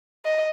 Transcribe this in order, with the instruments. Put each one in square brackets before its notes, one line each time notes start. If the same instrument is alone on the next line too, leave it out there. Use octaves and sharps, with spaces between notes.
[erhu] D#5